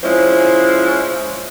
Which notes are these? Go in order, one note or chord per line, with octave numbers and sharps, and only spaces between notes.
F3 G#3 C#4 E4 C5